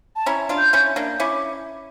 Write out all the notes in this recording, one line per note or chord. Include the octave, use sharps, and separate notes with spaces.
A5
C#4 E4 A#5
D4 F4
G6
C#4 E4
A#3 D4
C#4 E4 D6